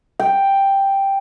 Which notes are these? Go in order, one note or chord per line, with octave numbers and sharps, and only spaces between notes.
G5